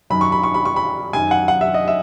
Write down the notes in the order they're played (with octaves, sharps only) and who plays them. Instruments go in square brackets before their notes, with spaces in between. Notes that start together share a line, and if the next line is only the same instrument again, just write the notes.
[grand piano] F#2 D#3 F#3 B5
C#6
B5
C#6
B5
C#6
B5
F#2 D#3 F#3 G#5
F#5
F#5
E5
D#5
E5